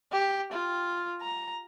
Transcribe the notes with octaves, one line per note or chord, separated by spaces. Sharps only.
G4
F4
A#5